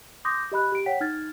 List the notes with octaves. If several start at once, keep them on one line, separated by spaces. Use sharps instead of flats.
C6 D6 D#6 G6 A#6
G4 D#5 B5 F#6
G4 D7
C#5 F#5 G5 B6
D#4 F6 G#6 A6